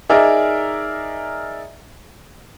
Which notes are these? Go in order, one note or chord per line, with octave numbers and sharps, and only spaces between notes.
D#4 G#4 A#4 D5 E5